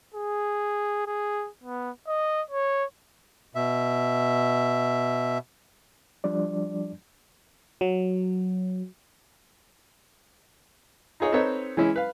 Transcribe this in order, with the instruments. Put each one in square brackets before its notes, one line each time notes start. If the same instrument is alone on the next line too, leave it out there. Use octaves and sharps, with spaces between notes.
[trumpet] G#4
G#4
B3
D#5
C#5
[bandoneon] B2 E5
[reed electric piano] F3 G3 D4 D5
[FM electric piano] F#3
[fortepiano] D#4 F4 G#4 C#5 D#5
C4 D#4 A4 B4 C#5
E3 G#3 C#4 E4
B4 F5